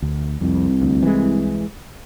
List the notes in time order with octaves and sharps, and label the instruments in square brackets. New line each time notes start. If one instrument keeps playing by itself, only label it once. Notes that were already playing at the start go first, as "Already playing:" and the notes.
[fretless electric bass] D2
[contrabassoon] C2 [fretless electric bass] F2
[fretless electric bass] D2
E3 G#3